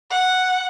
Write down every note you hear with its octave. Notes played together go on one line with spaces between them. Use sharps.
F#5